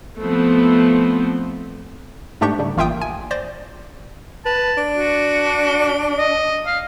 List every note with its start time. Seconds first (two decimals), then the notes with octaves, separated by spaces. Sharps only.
0.19 F3 A3 B3 C4
2.41 G#2 A3 D4 G4 C#6 G6
2.59 C#3 G3
2.77 A1 A#3 F4 E5 G5 D#6
3.01 G#5
3.31 C5 D5 A#6
4.45 B4 A5
4.77 D4
4.97 F#4
6.18 D#5
6.66 F5